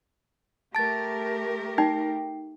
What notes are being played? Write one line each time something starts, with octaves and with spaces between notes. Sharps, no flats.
A3 G4 A#4 A5 A6
D#4 G5